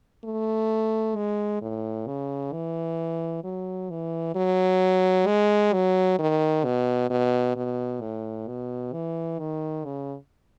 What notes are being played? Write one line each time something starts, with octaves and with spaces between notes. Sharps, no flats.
A3
G#3
A2
C#3
E3
F#3
E3
F#3
G#3
F#3
D#3
B2
B2
B2
A2
B2
E3
D#3
C#3